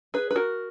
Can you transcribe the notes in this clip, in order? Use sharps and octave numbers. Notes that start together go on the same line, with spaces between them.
G#4 B4
B4
F#4 A#4